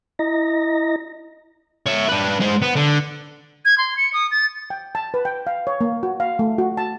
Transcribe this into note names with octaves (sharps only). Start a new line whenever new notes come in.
E4 D#5 A#5 A#6
C#5 E5
D4 B4
G#3 C5
B3
D3
G#6
C6
C#7
D#6
A6
G5
A5
B4
G5
F5
C#5
A#3
F#4
F5
A3
F#4
A5